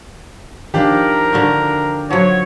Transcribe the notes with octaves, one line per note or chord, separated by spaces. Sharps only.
D#3 F3 D4 D#4 F4 G4 A#4
D3 A#3 F#4
F3 F#3 C#5 F#5